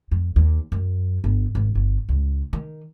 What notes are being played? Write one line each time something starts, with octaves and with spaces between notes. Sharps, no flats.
F2
D#2
F#2
G1
G#1
G1
C#2
D#3